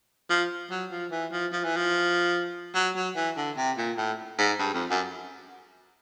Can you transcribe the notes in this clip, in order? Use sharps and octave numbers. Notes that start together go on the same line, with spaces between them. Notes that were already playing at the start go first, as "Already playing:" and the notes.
F3
F#3
F3
E3
F3
F3
E3
F3
F#3
F#3
E3
D3
C3
A#2
A2
G#2
G2
F2
F#2